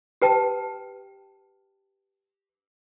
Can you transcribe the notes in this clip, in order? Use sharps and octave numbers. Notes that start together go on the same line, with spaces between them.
G4 B4 G5 A5